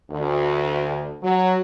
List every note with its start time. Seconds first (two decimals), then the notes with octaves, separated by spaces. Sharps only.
0.11 D2
1.23 F#3